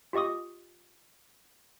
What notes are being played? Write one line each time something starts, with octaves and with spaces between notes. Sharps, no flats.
F4 G4 D#5 C#6 D#6